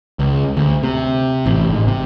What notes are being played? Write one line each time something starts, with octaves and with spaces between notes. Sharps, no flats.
C#2
D2
C3
A1
G#1
C3